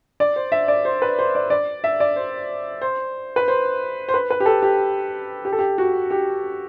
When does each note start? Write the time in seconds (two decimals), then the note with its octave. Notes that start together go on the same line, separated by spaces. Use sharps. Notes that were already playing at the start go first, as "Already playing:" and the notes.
0.20 D5
0.36 C5
0.52 E5
0.68 D5
0.85 C5
1.02 B4
1.19 C5
1.35 D5
1.50 D5
1.84 E5
2.00 D5
2.16 C5
2.82 C5
3.36 B4
3.48 C5
4.09 C5
4.14 B4
4.30 B4
4.40 G4
4.46 A4
4.63 G4
5.45 G4
5.52 A4
5.59 G4
5.78 F#4
6.11 G4